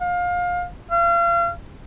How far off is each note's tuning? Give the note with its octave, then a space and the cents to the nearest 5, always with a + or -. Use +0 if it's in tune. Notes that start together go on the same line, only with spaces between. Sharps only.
F5 +25
F5 -35